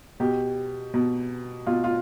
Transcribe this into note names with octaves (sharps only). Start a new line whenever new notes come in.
B2 G4
B2
B2 F4
F4